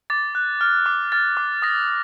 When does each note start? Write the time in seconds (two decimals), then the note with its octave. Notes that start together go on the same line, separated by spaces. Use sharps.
0.10 D6 A6
0.35 F#6
0.61 F6
0.86 D6
1.12 F6 A6
1.37 D6
1.62 D#6 A#6